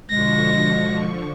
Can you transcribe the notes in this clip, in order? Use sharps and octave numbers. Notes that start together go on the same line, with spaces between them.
B2 D3 F3 G#3 C#6 A#6